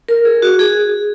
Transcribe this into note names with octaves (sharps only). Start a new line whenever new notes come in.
A#4
G#4
F#4
G#4